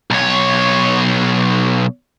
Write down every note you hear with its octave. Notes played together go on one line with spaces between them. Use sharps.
B1 C#5